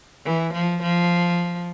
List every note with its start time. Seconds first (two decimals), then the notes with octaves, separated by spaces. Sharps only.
0.25 E3
0.53 F3
0.82 F3